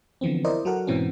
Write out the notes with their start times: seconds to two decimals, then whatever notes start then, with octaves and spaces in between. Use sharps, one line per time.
0.21 D3 E3 F3 B3 C4
0.45 E4 A#4 C5 D5 D#5
0.65 F#3 F#4 A4 A#4 F#5
0.87 G#2 B2 E3 C4 C#4